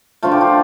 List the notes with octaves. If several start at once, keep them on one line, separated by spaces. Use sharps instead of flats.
D3 F3 A3 F4
G4
F4